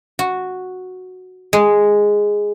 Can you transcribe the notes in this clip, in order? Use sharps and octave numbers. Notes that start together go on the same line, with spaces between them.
F#4
G#3